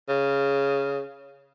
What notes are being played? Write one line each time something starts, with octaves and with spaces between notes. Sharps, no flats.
C#3